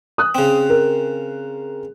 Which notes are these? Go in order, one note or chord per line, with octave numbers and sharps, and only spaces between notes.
D#6 F#6
C#3 C4
A#4